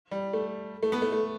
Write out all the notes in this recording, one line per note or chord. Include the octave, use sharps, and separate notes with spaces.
G3
A3
A3
B3
A3
A3